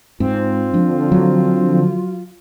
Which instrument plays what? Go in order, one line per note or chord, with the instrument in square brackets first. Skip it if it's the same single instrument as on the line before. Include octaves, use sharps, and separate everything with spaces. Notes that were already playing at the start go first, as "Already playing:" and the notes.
[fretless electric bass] G#2 [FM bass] C4 [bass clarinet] F4
[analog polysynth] D3 F3 [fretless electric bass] D4
[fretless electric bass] F#3